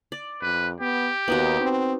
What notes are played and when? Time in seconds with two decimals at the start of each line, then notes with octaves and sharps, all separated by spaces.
0.12 D5
0.42 F2 B4
0.81 B3 G4
1.28 D#2 B3 D#4 F#4
1.61 C4